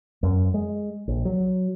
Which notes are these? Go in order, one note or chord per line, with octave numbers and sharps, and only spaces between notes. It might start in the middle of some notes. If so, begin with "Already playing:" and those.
F#2
G#3
A#1
F#3